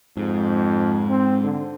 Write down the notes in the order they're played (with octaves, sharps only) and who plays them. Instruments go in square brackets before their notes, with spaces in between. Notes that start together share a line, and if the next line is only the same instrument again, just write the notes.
[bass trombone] F2 [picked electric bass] G#2
[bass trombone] C4
D3